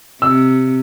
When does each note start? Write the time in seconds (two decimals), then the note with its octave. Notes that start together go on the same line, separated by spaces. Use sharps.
0.22 C3 E6